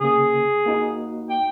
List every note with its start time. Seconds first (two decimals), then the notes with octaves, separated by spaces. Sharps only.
0.01 C#3 A#3 G#4
0.66 A#3 D#4 F#4
1.30 G5